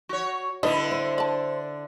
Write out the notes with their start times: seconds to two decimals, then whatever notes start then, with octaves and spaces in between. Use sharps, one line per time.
0.09 F#4 C#5
0.63 D3 D4 E4 B4 D#5
0.91 C5
1.18 D5 A5